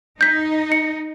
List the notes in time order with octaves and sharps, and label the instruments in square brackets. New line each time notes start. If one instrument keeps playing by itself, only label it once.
[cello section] D#4 [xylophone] G6 B6
[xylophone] C#7